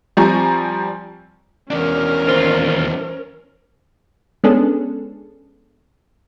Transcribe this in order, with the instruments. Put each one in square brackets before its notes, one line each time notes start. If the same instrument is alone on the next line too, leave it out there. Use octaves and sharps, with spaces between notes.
[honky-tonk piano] F3 G3 C4 G#5 A#5 C#6
[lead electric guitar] E2 D4 [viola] C#4 A#4
[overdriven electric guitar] D#2 F4 [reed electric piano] C5
[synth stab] G#3 B3 C#4 D4 G#4 A4